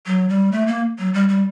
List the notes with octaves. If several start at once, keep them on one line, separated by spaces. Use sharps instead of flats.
F#3
G3
A3
A#3
F#3
G3
G3